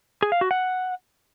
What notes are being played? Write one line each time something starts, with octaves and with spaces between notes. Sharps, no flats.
G#4
F5
F#4
F#5